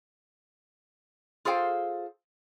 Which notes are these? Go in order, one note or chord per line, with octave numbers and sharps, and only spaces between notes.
F4 G#4 A4 C5 F5 G5